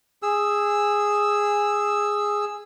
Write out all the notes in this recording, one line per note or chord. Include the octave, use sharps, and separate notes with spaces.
G#4 E6